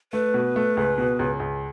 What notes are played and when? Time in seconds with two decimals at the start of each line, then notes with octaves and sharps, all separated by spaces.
0.13 A3 B4
0.34 B2
0.56 A3
0.77 C#2
0.98 B2
1.19 C#2
1.40 C#2